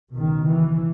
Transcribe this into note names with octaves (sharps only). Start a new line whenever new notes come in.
C#2 B2 D#3
E3